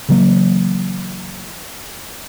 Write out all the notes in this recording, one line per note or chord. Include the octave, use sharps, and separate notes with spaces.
C#3 E3 F#3 A#3